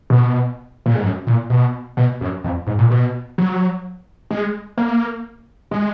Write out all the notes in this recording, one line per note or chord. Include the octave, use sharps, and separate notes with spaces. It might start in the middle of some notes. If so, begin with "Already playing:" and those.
B2
A#2
G#2
F#2
A#2
B2
B2
F#2
F2
G#2
A#2
B2
F#3
G#3
A#3
G#3